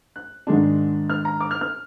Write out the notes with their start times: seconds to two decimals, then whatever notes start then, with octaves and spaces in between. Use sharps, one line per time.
0.16 F#6
0.47 G#2 D#3 G#3 D4
1.10 F6
1.25 A#5
1.41 D6
1.51 F6
1.61 F6